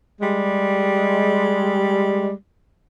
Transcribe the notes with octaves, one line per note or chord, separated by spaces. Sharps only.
G3 G#3